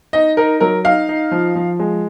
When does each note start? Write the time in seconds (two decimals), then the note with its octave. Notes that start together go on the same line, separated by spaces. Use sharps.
0.13 D#4 D#5
0.37 D#4 A#4
0.60 F#3 A#4
0.84 D#4 F5
1.09 D#4
1.31 F3
1.56 F3
1.79 G#3